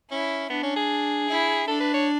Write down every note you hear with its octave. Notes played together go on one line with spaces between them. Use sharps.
C#4 E4
B3 D4
C#4
G#4
E4
D4 A4
B4
C#5